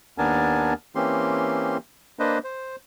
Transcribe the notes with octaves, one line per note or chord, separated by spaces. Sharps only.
D#2 B3 D4 A#4 G#5 A5
E3 A#3 C4 C#4 G4 C6
A#3 D4 B4 C5 D#5
C5